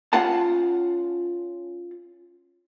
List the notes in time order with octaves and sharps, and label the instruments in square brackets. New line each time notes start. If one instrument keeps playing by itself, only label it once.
[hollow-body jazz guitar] C#4 F4 F5 F#5 A5